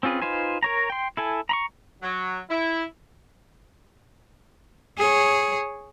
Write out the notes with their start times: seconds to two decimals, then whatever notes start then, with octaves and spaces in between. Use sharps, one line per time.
0.03 C4 C#4 F4 G#4 B4
0.22 D#4 F4 B4 C5 G#5
0.63 A#4 C#5 A#5
0.90 G5 C6
1.17 E4 A4 G#5
1.49 A#5 B5 C#6
2.03 F#3
2.50 E4
4.98 G#4 C#5